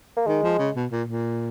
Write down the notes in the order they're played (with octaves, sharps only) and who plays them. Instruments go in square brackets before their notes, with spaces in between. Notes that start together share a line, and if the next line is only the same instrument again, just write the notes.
[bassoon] A#3
[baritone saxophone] D#3 [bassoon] G#3
[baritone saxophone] F3
C#3
B2
A#2
A#2